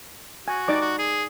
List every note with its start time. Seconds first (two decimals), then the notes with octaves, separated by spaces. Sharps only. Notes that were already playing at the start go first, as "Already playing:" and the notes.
0.48 F#4 G#5
0.68 D#4 D5 D6
0.81 F#4
0.98 G#4